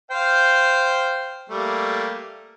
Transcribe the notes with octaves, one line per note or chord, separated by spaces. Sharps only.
C5 F5 G5
G3 A3 A#3